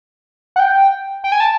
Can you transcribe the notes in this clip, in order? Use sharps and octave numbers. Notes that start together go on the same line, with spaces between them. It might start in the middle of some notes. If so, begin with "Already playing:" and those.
F#5
G5
G5
G#5
A5